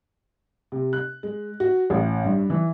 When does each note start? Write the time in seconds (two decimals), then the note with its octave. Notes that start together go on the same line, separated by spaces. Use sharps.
0.72 C3
0.93 F#6
1.23 G#3
1.60 F#4
1.90 A1
2.24 G2
2.50 E3